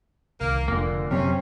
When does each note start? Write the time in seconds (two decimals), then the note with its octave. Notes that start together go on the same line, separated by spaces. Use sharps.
0.41 C2 D#3 A#3
0.68 F1 A#2 D3 A#3
1.11 F#2 C3 F#3 C4 C#4